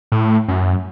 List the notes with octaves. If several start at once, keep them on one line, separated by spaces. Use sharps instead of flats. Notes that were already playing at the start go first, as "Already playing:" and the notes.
A2
F#2